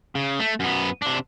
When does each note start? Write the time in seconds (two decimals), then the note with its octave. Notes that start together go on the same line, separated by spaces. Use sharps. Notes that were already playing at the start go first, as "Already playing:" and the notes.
0.15 C#3
0.40 A3
0.60 F#2 B3
1.02 C3 D4